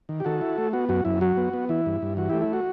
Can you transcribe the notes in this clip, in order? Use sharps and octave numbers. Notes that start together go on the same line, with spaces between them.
D#3
G4
D#3 F#4 A4
E4
A3
B3 F#4
F#2 F#4
F#2 E4
F#3 F#4
B3
B3
E3 E4
G2
G2
E3 F#4
A3 E4 G4
E4
F#4